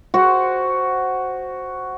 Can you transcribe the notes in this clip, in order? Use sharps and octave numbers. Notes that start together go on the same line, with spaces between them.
F#4 C5 F#5